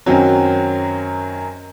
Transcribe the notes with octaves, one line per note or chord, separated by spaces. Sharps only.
F#2 D#3 F#3 C4 C#4 F#4